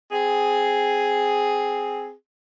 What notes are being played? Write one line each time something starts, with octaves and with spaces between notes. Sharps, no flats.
C4 G#4